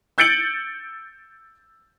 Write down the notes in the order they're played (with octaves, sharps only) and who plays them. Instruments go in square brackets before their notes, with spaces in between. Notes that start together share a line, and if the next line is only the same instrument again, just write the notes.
[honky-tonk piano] E6 G6 A6 C#7 D7 F#7